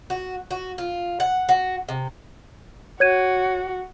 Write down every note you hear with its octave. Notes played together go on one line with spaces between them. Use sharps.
F#4
F#4
F4
F#5
F#4
C3
F#4 C#5 G#6 D#7